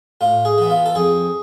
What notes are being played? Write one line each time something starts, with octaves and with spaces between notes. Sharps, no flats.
A2 F4
G#4
E3 B3
F4
A4
F2 G#4